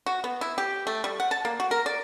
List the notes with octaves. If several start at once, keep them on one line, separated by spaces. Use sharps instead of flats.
F#4
B3
E4
G4
A3
G3
F#5
A5
A#3
F#4
A#4
D5